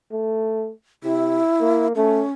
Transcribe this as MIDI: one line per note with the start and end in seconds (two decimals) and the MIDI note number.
0.12 0.71 57
1.04 1.39 48
1.04 1.87 64
1.61 1.93 58
1.96 2.23 57
1.96 2.32 61